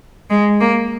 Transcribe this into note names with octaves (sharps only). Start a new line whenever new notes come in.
G#3
A#3